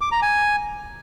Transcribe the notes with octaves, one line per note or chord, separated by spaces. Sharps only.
D6
A#5
G#5